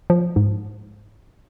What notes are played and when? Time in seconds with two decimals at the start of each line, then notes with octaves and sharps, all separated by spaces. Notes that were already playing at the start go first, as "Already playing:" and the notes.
0.10 F3
0.36 G#2